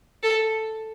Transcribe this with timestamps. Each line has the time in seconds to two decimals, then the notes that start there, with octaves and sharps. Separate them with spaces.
0.23 A4